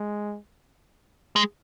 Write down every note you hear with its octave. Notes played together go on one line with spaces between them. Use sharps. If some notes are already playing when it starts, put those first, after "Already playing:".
Already playing: G#3
G#3